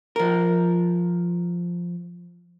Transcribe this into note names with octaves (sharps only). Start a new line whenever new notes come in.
F3 A#4